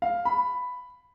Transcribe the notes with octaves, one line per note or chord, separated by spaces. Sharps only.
F5
B5